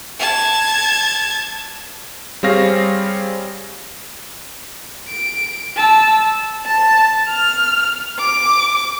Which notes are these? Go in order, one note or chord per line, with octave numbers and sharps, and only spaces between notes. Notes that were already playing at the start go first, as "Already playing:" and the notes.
A5 G#6
G3 C4 G#4 C#5 F5 A#6
D7
A5 E6
A5
F6
D6